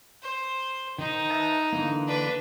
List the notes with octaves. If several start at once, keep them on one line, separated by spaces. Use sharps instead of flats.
C5
D#3 D#4 C5
B4 E5 A5
D3 E3 A#3
D4 B4